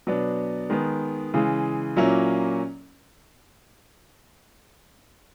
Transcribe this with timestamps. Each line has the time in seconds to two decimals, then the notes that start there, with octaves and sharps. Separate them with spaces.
0.07 B2 F#3 B3 D4
0.70 D#3 G#3 B3
1.34 C#3 E3 G#3
1.96 A#2 F#3 A#3 C#4 E4